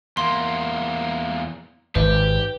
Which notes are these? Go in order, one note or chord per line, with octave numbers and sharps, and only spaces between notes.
E2 A#3 C6
G#1 G4 B4